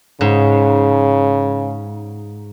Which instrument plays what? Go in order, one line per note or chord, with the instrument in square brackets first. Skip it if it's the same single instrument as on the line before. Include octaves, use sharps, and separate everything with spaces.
[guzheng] G#2 [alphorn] C#3